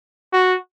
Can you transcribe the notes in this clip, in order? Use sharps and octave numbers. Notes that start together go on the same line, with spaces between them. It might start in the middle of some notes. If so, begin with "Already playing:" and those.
F#4